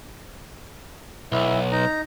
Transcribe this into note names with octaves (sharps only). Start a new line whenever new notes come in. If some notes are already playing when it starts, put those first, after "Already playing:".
B1 E4
D#4 A#5